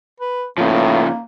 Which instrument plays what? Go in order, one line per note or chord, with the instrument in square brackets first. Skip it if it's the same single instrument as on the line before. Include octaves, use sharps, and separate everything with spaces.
[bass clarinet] B4
[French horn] A2 [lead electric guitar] C#3 F3 [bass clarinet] A#3